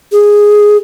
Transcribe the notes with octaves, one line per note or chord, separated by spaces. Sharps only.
G#4